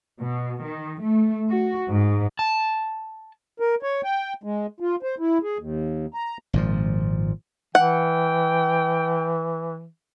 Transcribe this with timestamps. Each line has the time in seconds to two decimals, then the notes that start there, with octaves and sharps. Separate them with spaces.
0.19 B2
0.60 D#3
1.01 A3
1.49 F#4
1.89 G#2
2.39 A5
3.60 A#4
3.83 C#5
4.04 G5
4.44 G#3
4.80 F4
5.03 C5
5.19 E4
5.43 G#4
5.59 D#2
6.14 A#5
6.53 G#1 A#2 F3
7.75 E3 F#5 G5